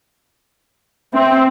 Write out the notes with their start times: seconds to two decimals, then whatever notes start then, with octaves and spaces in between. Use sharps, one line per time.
1.14 C4 E5